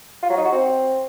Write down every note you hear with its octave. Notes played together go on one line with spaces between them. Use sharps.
F4
F#3
D#4
F#4
C4